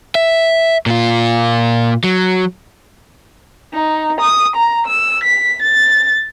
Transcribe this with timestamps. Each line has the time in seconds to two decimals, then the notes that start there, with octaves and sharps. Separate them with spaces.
0.15 E5
0.86 A#2 F4
2.04 F#3
3.74 D#4
4.21 D#6
4.56 A#5
4.87 E6
5.24 B6
5.62 A6